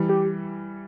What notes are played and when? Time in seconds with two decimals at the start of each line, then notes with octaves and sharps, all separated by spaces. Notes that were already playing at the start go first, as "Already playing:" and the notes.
Already playing: E3 G3
0.09 G4